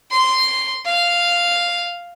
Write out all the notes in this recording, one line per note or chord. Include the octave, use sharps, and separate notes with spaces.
C6
F5